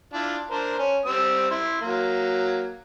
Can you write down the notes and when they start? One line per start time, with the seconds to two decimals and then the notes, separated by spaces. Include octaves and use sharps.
0.13 D4 E4 F4
0.51 D4 A#4 C5
0.79 C#4
1.05 G3 C4 E6
1.51 E4 C6
1.81 F#3 A#3